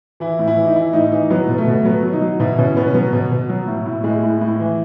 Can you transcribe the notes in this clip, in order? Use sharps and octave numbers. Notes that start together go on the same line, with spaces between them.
E3 E4
A2
E4
E3
D#4
E3 E4
A2 D#4
E3 D#4
F#3 B3
B2
A3
B2
F#3 B3
F#3
D#4
F#3
B2 E4
B2 C#4
B2 B3
C#4
F#3 B3
B2
B2
F#3
A2
A2
A2 G#3
A2
A2
E3